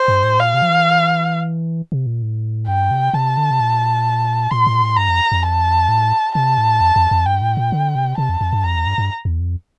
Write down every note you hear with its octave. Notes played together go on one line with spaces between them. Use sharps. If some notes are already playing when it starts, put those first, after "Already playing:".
Already playing: C5
G2
A2
A#2 F5
C3
F3
E3
C3
A#2
A2
G2 G5
C3
C3 A5
D3
C3
A#2
A#2 C6
A2
A#2
A2
G2 A#5
F2
F2
A5
A2
C3 A5
A2
F2
F2
F2
G2 G5
A2
A#2
D3
C3
C3 A5
F2
F2
G2
F2 A#5
E2
G2
G2
E2
F2